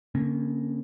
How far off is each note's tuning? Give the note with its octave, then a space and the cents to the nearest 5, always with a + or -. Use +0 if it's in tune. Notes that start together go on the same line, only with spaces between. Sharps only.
D3 -45 A#3 +0 C#4 -30